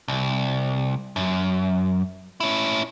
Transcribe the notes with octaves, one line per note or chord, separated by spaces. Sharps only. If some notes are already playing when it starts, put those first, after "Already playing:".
C2
F#2
C#4 E4